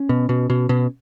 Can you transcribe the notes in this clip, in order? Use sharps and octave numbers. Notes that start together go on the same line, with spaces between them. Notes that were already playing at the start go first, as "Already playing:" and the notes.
Already playing: C#4
B2
B2
B2
B2